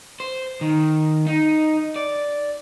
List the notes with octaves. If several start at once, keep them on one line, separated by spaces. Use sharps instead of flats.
C5
D#3
D#4
D5